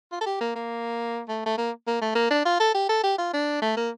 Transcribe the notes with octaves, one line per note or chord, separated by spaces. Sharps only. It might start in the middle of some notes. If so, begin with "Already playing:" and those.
F4
A4
G4
A#3
A#3
A3
A3
A#3
A#3
A3
A#3
D4
F4
A4
G4
A4
G4
F4
D4
A3
A#3